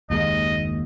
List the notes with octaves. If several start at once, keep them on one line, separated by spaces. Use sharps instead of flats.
F#1 D#2 G#3 D#5